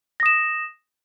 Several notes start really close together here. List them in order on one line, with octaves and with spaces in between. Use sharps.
A#6 D#6 E7